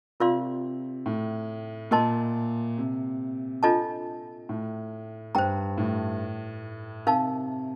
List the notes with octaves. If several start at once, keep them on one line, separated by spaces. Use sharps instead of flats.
C3 F4 A#4 D5 F5 C6
A2
A#2 A#4 D#5 A5 C6
C3
D4 F4 A4 D#5 A5
A2
G2 C5 G5 A#5
A2
C3 D#4 A#4 F5 A5